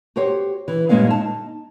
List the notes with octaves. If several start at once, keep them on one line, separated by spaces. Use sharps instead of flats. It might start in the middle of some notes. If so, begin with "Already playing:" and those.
F#4 G4 C5 C#5
E3
G2 A#2 G#3 A#3 C#4 F5
D#4 A5